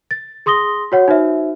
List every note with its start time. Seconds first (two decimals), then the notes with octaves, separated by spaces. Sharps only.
0.11 A6
0.46 G#4 C6 D#6 A#6 G7
0.92 F#4 C#5 F#5
1.08 D#4 F#4 C5 E5